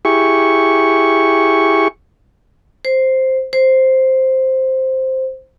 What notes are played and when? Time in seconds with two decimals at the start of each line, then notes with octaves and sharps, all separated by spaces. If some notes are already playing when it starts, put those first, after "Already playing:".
0.05 E4 G4 G#4 C#6
2.85 C5
3.53 C5